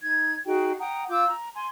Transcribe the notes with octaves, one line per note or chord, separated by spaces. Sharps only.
D#4 G#6
D#4 F#4 G#4 G5
F#5 G5 A#5 D#6
F4 D6 E6 G6
A#5
G#5 C6